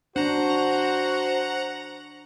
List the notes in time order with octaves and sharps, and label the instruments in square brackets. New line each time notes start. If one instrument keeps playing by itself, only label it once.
[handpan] D4 [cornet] F#4 [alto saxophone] C5 [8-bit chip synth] F#5 A#5